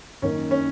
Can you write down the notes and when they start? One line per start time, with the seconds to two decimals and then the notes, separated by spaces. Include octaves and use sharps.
0.22 F#2 D#3 A#3 C#4
0.51 C#4